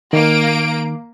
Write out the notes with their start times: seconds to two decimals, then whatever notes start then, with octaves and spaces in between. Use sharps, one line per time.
0.13 D#3 A#3 D7